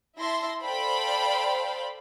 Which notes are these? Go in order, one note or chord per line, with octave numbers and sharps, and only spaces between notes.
E4 E5 A5 C6 A#6
A4 C5 D5 F5 G5 B5